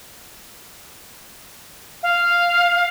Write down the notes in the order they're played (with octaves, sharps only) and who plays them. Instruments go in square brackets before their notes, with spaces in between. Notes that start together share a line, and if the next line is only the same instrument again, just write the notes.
[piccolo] F5